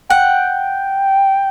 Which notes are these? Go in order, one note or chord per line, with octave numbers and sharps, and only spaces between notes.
F#5 G5